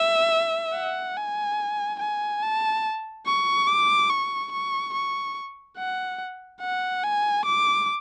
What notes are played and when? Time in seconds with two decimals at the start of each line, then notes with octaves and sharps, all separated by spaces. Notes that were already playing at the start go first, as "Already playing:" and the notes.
Already playing: E5
0.74 F#5
1.17 G#5
2.00 G#5
2.43 A5
3.27 C#6
3.67 D6
4.10 C#6
4.52 C#6
4.94 C#6
5.77 F#5
6.61 F#5
7.03 G#5
7.45 D6